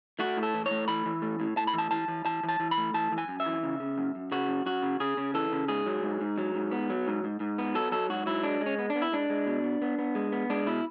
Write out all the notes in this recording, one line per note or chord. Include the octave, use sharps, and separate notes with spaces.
A3 F#4
A2
A4
E3
C#5
A3
E3 B5
E3
A3
A2
A2 A5
B5
E3 A5
E3 A5
E3
E3 A5
E3
A5
E3
B5
A3
E3 A5
E3
G#5
F#2
E5
E3
C#3
C#3
F#2
F#2
C#3 F#4
F#2
F#2 F#4
C#3
C#3 G#4
C#3
E3 A4
C#3
G#2 G#4
F#3
G#2
G#2
F#3
G#2
B3
F#3
G#2
G#2
G#2
B3
F#3 A4
F#3 A4
G#2 F#4
F#3 E4
G#3 D4
G#3
C#4
B3
D4
B3
E4
G#3 D4
G#3
B2
B3
B3
B3
G#3
B3
G#3 D4
B2 E4